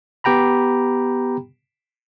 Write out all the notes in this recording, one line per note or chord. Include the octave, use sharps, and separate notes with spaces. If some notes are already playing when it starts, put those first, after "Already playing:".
B3 G4 G5 A#5 B5